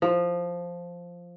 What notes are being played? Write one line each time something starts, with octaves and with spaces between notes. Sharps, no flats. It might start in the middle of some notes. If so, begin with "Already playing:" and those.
F3